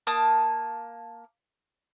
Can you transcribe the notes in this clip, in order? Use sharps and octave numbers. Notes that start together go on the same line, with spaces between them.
A#3 A5 D#6